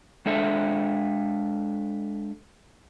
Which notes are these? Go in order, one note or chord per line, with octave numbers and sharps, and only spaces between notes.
G#3 D4 A4 E5